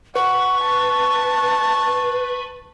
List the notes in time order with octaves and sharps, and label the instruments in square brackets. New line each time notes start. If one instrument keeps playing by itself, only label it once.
[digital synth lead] B4 [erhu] F#5 [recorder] C#6
[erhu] A5